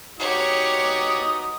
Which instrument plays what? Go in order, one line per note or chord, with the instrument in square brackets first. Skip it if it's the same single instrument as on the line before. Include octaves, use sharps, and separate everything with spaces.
[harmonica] D#4 F#4 D#6 [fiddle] G4 C#5